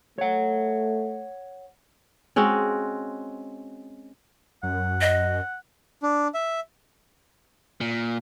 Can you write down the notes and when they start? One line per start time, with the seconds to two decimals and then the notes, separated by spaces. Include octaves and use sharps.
0.18 A3 C#5 F#5
2.36 G#3 C4 C#4 F#4
4.63 F#2 F#5
5.01 D#5
6.03 D4
6.34 E5
7.81 A#2